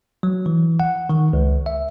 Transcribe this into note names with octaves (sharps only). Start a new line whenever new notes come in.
F#3
E3
F#5
D#3
C#2
E5